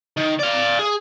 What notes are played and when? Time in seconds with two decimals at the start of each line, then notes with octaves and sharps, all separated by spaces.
0.17 D#3
0.39 D5 F5
0.79 G#4